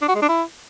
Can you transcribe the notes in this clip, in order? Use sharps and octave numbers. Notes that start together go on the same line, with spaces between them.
D4
F#4
G#3
D4
E4